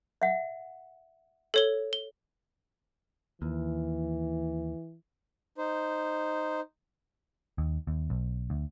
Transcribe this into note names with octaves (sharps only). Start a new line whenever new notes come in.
E5 F#5
A4 C#5 G7
G7
D#2 E3
D#4 C5
D#2
D#2
B1
D2